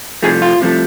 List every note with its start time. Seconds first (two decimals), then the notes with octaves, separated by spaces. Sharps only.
0.23 C2 C3 F3 A3 G#4
0.42 F4
0.60 C2 C3 F3 A3